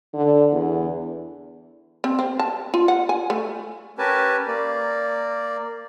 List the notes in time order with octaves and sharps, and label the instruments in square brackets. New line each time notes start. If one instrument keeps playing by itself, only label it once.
[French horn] D3
E2
[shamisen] C4
C4
A5
F4
F#5
G#5
A3
[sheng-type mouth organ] C#4 G4 A#4 B4 G#5 A5
A#3 D5